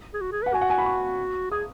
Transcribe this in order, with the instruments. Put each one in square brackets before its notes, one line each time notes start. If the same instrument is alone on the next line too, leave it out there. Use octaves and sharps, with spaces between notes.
[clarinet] G#4
F#4
G#4
[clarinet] B4 [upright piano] F#5
[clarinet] F#4 [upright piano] G#5
[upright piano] F#5
G#5
B5
C#6
[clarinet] G#4 [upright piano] D#6